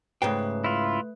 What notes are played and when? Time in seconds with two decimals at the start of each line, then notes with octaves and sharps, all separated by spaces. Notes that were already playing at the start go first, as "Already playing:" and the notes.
0.22 C#2 G#2 A3 B4 G5
0.64 E4 F4